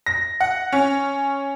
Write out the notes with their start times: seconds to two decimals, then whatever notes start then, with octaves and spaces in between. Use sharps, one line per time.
0.06 A#6
0.40 F#5
0.73 C#4